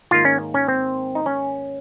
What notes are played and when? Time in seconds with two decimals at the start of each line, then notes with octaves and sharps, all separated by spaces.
0.11 G#2 D#3 A#3 F4
0.25 C#4
0.54 C#4
0.68 C4
1.15 D#4
1.26 C#4